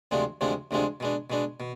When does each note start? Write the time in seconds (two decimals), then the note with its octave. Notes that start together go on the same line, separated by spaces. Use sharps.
0.11 D2 C3 F3 G#3 D4
0.41 D2 C3 F3 G#3 D4
0.71 D2 C3 F3 G#3 D4
1.00 B2 G#3 D4
1.30 B2 G#3 D4
1.60 B2